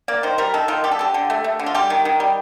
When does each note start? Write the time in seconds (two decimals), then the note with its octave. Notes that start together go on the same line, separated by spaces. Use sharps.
0.08 A#3 D5
0.23 D#3 C5
0.38 G3 A#4
0.54 D#3 A4
0.68 D#3 F4
0.84 G3 G4
0.91 A4
0.99 D3 G4
1.14 D3
1.30 A3
1.44 A3
1.59 D3
1.66 F4
1.74 G3 G4
1.90 D#3
2.05 D#3
2.20 G3